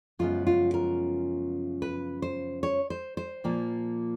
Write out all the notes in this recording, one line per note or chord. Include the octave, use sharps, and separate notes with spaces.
F#2 C#3 F3 G#3 B3 F4
F4
A#4
B4
C5
C#5
C5
C5
A#2 F3 A#3